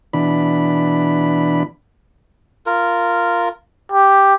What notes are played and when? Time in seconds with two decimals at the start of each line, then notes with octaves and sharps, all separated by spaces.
0.13 B2 E3 D4 B5
2.66 F4 A#4
3.92 G4